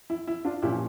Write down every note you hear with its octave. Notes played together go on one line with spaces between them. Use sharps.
E4
E4
D4 F4
A#2 F3 C#4 E4 G4